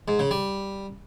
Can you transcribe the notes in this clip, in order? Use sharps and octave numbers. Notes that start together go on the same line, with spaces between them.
G#2
C#3
G3